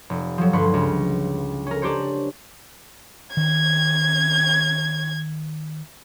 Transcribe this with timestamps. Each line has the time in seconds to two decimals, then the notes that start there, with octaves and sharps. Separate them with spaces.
0.10 F1
0.38 F3 F#3
0.53 D2 G2 B4 C6 C#6
0.74 C#2
1.67 C#4 A#4
1.82 C#4 D4 G4 C5 C#5
3.37 D#3 G#6